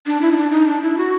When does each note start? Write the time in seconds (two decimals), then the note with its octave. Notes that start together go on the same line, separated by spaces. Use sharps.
0.06 D4
0.21 E4
0.32 D#4
0.36 D4
0.51 D#4
0.67 D4
0.82 E4
0.98 F#4